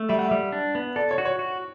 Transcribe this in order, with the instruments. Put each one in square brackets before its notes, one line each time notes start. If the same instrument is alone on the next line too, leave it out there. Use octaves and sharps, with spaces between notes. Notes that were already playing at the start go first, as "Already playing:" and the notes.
Already playing: [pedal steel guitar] A3
[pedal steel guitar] G3 [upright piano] E5
[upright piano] F#5
[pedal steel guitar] G3 [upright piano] E5
[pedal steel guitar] D4
B3
[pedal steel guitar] A4 [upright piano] D5
[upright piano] C#5
[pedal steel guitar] F#4
[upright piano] C#5
[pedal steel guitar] F#4